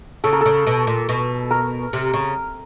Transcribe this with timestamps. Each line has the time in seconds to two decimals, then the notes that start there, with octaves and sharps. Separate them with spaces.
0.24 C#3 A4
0.33 A#4
0.41 C#3 A4
0.67 B2
0.87 A#2
1.09 B2
1.51 A#4
1.93 C3
2.13 C#3